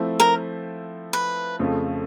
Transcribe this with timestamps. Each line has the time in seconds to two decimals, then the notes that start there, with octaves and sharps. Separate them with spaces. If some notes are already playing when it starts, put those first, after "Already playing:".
Already playing: F3 A3 C4 E4
0.20 A#4
1.13 B4
1.59 F2 C#3 F3 A3 C4